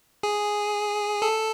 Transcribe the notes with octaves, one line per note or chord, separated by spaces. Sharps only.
G#4
A4